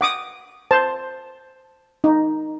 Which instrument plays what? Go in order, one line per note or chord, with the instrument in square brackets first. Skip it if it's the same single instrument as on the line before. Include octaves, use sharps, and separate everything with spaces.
[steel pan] F#5 D6 D#6
C5 A5
D#4